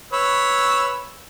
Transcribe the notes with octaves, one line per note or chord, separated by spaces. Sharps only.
B4 C#5 E6